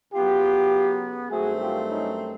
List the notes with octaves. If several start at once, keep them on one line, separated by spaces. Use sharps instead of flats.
C#3 F#3 B3 F4 G4
G2 D#3 F#3 A3 C4 F#4 G#4
F4 G4
C#4 D#4